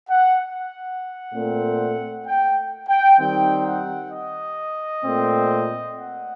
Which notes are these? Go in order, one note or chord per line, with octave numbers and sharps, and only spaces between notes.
F#5
F#5
A#2 A3 C4
G5
G5
D#3 G3 C4 D#4 G5
F#5
D#5
A#2 A3 C4
F#5